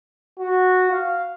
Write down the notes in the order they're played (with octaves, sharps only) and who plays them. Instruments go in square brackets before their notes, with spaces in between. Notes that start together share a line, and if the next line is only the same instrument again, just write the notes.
[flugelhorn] F#4
F5